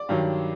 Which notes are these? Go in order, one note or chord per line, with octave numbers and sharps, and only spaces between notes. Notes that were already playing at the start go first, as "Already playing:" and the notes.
Already playing: D5
G2 D#3 F#3